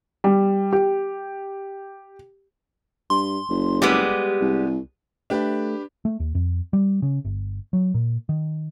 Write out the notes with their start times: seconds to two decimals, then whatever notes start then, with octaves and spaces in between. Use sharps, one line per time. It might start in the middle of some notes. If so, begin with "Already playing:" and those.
0.24 G3
0.73 G4
3.10 G2 C6
3.49 F#1
3.82 G3 G#3 B3 G4
4.41 C2
5.30 A3 D4 G4 B4
6.05 A3
6.20 D#2
6.35 F2
6.73 G3
7.02 C#3
7.25 G1
7.73 F#3
7.94 A#2
8.29 D#3